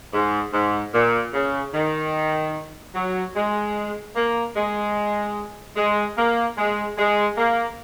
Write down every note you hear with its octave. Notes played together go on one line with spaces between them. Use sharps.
G#2
G#2
A#2
C#3
D#3
F#3
G#3
A#3
G#3
G#3
A#3
G#3
G#3
A#3